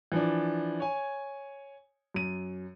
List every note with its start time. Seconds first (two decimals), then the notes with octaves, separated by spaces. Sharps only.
0.12 E3 F3 D4
0.80 C#5 G#5
2.14 F#2 D#7